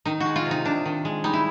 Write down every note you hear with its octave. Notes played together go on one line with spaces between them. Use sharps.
D#3 D#4
F#4
G#3
F4
C3
D#4
C3 D4
D#3
G#3
G3 D#4
E4